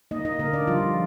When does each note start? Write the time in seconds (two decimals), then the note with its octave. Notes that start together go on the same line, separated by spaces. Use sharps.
0.11 A#3 D#4 D#5
0.25 D#4 D#5
0.39 D3 A#3 A#4
0.53 D4 D5
0.67 F3 G3 F4